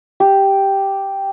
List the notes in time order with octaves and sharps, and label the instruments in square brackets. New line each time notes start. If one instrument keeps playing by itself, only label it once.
[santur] G4